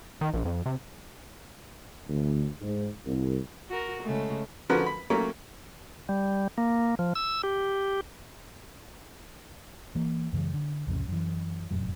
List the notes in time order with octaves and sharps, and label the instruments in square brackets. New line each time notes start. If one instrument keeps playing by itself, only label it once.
[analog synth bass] D#3
A#1
F2
C3
[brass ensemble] D2
G#2
C2
[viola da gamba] F#4 A#4
C#3 G#3 A3
[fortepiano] D3 F3 C#4 F#4 A#4 B4
B5
F#3 A3 A#3 C#4
[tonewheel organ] G3
A#3
F3
E6
G4
[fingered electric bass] E3 A#3
F#2 C#3 E3 G#3
D3
C2 F2 A2 C#3
F#2 E3
F1 F#2 A2 F#3